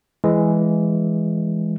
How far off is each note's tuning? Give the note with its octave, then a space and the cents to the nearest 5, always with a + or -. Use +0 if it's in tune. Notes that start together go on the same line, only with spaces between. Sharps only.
E3 +10 G#3 +0